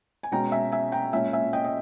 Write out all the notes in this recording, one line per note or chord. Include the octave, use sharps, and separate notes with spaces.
G#5
B2 G#3 C#4 G5 A#5
E5 G#5
E5 G#5
G5 A#5
A#2 G#3 C#4 E5 G#5
E5 G#5
D#5 G5
D#5